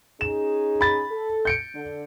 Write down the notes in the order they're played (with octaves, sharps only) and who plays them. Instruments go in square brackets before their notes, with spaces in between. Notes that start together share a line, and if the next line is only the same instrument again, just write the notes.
[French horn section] C#4 D#4 G#4 [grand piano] E7
[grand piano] B5 A6
[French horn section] A4
[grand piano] G6 C#7 D7
[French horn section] D3